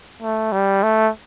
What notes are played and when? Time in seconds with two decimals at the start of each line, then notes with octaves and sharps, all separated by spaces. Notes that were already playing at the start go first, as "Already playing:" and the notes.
0.22 A3
0.52 G3
0.83 A3